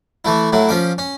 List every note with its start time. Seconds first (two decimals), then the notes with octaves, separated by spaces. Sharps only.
0.25 E3 A3 E4
0.52 A2 F#3 E4
0.69 F3 C#4 D6
0.98 C#4